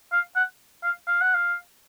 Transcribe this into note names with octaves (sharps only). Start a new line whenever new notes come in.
F5
F#5
F5
F5
F#5
F5